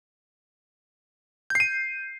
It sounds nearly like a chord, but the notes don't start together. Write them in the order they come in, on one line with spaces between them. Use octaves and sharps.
G6 C7 D#7